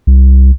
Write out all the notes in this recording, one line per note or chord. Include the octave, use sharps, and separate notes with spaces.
C2